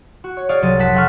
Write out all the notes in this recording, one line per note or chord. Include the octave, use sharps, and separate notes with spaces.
F#4
C#5
G#4 C#5 D5 F5
C2 F#3 A6 D#7
F1 F#5 A5 B6 E7
F3 A4 E5 F#5 C#6 F6